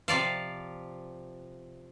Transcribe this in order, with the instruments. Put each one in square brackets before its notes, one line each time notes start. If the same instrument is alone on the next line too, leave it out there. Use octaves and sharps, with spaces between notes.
[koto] C3 F3 D5 F5